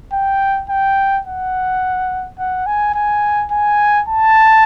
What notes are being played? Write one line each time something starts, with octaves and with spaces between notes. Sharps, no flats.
G5
G5
F#5
F#5
G#5
G#5
G#5
A5